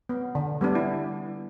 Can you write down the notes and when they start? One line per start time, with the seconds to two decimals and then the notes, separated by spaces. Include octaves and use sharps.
0.09 B3
0.35 D3
0.61 G3 B3 D4
0.75 E4